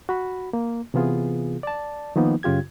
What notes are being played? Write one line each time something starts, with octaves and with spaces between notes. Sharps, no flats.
F#4 B5
A#3
C3 E3 B3 F4 G#4
D5 A5
D#3 F3 A#3 B3 D#4
F#2 C#3 F4 G4 G#6